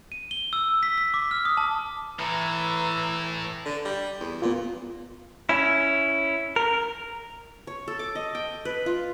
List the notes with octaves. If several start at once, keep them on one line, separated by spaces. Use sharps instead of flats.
D#7
G7
E6
B6
B6
D6
F6
D#6
A5
A2 E3 A#5
D3
G3
E2
A#2 B3 F4
C#4 E4
A#4
C#5
A4
D6
D#5
G5
B4
F4